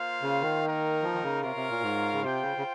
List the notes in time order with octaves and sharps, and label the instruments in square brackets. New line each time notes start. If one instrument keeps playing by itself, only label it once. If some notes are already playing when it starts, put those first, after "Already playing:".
Already playing: [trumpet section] A#3 F4 C5 F5
[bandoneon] C#3
D#3
[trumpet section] A#3 D#4 A#4
[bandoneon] F3
D#3
C#3
[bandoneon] C3 [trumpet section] F4 A#4 C#5 F5
[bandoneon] C3
A#2
G#2
C#3
[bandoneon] C3 [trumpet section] F4 C5 G5
[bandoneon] C#3
C#3